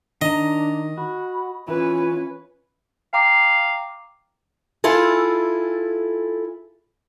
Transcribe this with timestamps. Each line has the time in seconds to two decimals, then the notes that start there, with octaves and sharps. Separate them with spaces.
0.22 D#3 D4 D#5 A#5
0.97 F#4 B5
1.68 E3 C#4 F4 B4
3.13 F5 G5 A#5 D6
4.84 E4 F4 G#4 A4